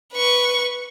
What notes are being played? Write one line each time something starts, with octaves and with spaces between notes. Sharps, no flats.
B4 C#6